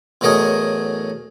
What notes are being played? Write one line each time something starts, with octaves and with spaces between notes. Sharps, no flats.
E2 A2 F#3 A#4 D#5 G#5